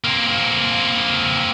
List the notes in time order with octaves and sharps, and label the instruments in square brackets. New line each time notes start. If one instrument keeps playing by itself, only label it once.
[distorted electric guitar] A#3 C4